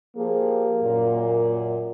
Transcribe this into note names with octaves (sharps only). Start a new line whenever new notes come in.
F3 A#3 G4 G#4
F#2 A#2